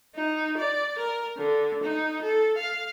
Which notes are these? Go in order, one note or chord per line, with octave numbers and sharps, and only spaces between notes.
D#4
D5
A#4
D3
D#4
A4
F5